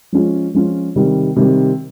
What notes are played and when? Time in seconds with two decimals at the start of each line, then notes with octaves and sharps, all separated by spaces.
0.12 F3 G#3 C#4 F4
0.54 F3 G#3 C#4 F4
0.96 C3 D#3 G3
1.36 C3 D#3 G3